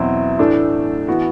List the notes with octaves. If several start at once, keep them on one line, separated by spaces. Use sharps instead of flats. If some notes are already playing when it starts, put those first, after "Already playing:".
Already playing: E2 B2 F#3 C4 E4
A2 E3 A3 D4 A4
E3 B3 F#4